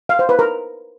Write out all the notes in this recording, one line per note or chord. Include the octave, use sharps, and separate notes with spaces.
F5
C5
B4
A#4